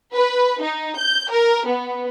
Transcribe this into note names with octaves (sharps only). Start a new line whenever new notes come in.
B4
D#4
G6
A#4
B3